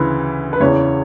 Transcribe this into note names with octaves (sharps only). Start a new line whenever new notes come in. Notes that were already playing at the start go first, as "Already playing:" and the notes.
Already playing: D2 C#3 E3 B4
B4
E2 C#3 E3 C#5